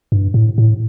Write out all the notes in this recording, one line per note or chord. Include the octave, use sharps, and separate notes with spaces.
G2
A2
A2